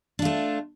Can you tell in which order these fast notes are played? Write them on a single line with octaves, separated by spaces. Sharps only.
D4 F4 A3